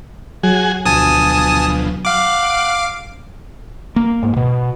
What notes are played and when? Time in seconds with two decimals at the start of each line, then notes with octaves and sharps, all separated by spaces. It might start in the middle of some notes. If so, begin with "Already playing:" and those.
0.43 F#3 F#4 G#4 G#5
0.85 D2 B2 F3 G#5 A5 D#6
2.05 F5 F#5 D6
3.96 A#3
4.23 G#2
4.36 B2